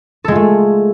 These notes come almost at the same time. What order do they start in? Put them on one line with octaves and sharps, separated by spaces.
A4 G#3 F4 A3